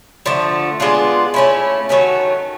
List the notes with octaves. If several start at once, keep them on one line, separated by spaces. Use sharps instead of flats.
D3 F3 A3
G#3 B3 D4 F4
A3 C#4 E4
D#3 F#3 A3 C#4